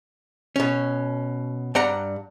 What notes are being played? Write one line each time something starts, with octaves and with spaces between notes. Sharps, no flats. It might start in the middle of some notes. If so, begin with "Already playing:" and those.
B2 C#4
G2 D5 F#5 A#5